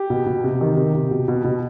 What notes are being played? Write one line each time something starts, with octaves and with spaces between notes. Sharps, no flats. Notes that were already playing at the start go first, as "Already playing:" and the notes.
Already playing: G4
B2
B2
C3
D#3
C3
C3
B2
B2
B2